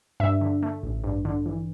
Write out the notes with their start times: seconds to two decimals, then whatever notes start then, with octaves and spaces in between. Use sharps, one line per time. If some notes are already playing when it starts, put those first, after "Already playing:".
0.20 G2 E5
0.41 D3
0.62 A3
0.83 A1
1.04 G2
1.25 D3
1.46 E3